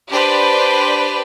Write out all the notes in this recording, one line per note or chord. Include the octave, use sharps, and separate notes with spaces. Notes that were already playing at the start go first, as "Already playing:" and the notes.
D4 G4 B4 C5 D5